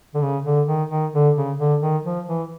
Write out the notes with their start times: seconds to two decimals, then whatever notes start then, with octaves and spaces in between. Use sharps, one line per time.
0.14 D3
0.22 C#3
0.44 D3
0.67 D#3
0.90 D#3
1.13 D3
1.36 C#3
1.58 D3
1.81 D#3
2.04 F3
2.27 E3